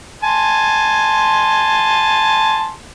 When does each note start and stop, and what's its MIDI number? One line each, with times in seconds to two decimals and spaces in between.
0.23 2.72 80
0.23 2.72 81
0.23 2.72 84